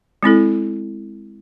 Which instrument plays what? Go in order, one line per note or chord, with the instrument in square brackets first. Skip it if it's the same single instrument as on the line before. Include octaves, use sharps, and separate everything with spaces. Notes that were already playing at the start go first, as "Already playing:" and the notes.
[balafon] G#3 C4 E4 A4